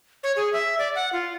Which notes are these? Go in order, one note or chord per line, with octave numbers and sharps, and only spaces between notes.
C#5
G#4
E5
D5
F#5
F4